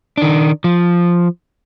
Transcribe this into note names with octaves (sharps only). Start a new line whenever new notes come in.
D#3 D4
F3